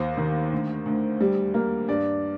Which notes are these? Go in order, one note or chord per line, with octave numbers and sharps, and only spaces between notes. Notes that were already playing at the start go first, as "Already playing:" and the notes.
Already playing: D#2 C5
D#3
D2
D2
G3
A#3
G2 D5